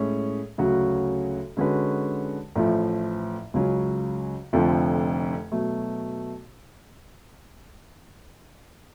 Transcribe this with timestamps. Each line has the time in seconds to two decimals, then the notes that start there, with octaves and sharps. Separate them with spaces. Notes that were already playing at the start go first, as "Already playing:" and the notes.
Already playing: A2 G#3 C#4 G#4
0.58 D2 C#3 F#3 C#4 F#4
1.57 D3 G#3 C#4 F#4 B4
2.55 A1 A2 F3
3.54 C#2 C#3 F#3 C#4
4.53 F1 F2 D3 F3
5.52 B2 F#3 A3